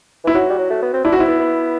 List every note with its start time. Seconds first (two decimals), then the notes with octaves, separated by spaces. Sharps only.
0.24 E3 E4
0.34 F#3 F#4
0.50 G3
0.58 F#3
0.70 A3
0.82 B3
0.93 C4
1.04 D4 E4
1.12 F#4
1.17 C4 E4
1.28 B3
1.40 B3